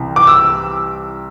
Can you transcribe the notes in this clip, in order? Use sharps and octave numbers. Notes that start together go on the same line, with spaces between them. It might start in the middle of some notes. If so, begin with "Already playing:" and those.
Already playing: C2 C3 E3
D6
E6